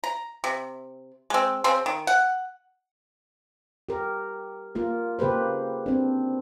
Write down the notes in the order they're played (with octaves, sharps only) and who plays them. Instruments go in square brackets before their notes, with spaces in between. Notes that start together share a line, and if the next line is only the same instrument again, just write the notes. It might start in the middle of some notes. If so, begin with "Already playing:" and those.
[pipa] A#5
C3
G#3 C4
C#3 C4 C6
D#3
F#5
[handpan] G4 A#4
A#3 F4 A#4
C#3 A#3 G4 B4 C5
C4 D4